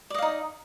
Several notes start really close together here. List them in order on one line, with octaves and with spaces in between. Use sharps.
D5 D#5 F5 D#4